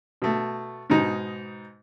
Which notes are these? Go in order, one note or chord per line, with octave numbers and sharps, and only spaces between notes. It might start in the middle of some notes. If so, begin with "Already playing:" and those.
B2 A3
G#2 B2 D#4